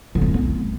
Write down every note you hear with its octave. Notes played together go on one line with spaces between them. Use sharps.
D3
B3
G2
B3